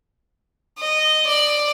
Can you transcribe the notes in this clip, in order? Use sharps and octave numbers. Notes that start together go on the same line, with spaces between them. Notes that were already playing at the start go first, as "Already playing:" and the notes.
D#5
D5